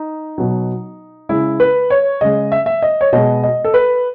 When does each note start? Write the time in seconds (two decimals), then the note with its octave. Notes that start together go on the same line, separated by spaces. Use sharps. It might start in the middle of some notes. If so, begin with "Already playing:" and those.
Already playing: D#4
0.38 B2 F#3
1.29 C#3 G#3 E4
1.60 B4
1.90 C#5
2.21 C#3 G#3 D#5
2.52 E5
2.66 E5
2.82 D#5
3.01 C#5
3.13 B2 G#3 D#5
3.44 D#5
3.64 A4
3.74 B4